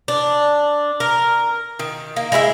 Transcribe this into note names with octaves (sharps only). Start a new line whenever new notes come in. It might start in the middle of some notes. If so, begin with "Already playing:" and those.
D4
A#4
D#3
A#3
G#3 E4 F4 E5